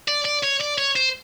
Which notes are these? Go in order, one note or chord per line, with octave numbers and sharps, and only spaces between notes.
D5
D5
C#5
D5
C#5
C5